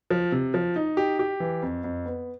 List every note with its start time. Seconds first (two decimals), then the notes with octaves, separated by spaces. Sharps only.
0.10 F3
0.32 C3
0.54 F3
0.76 D#4
0.97 G4
1.19 G4
1.40 E3
1.62 F2
1.84 F2
2.06 B3